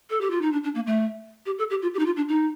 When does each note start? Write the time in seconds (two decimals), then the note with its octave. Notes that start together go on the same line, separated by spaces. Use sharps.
0.10 A4
0.21 G4
0.30 F4
0.42 D#4
0.52 D4
0.64 D4
0.75 A#3
0.87 A3
1.46 G4
1.58 A4
1.70 G4
1.82 F4
1.94 G4
1.99 D#4
2.06 F4
2.16 D4
2.29 D#4